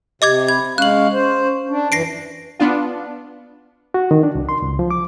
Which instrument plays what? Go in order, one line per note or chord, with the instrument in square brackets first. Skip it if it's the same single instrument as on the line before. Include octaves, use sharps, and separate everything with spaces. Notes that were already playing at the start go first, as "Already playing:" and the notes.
[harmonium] C3 [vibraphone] G4 [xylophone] D#5 D6 G#6
[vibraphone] B5 [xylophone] G#6
[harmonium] G#3 F5 [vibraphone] C#4 C#6 [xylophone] F#6 F#7
[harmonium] C5
D4
[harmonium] F#2 E3 [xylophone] A#6 C7 D7
[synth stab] B3 D4 F4
[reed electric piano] F#4
D#3
D4
C2
C6
C#2
F3
D6